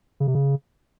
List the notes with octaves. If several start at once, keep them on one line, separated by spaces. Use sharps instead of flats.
C#3
C3
C#3